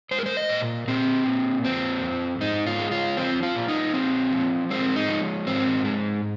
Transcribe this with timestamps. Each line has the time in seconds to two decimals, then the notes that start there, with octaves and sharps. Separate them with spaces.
0.11 G#3 C5
0.19 A#4
0.26 C5
0.37 D#5
0.49 A#2
0.88 A#2 C4
1.26 A#2
1.64 F2 C4
2.03 F2
2.40 G#2 D#4
2.66 F4
2.79 G#3
2.91 F4
3.17 F3 C4
3.43 F4
3.56 A#2
3.68 D#4
3.93 F3 C4
4.32 F3
4.70 G#3 C4
4.96 D#4
5.09 F3
5.47 G#2 C4
5.85 G#3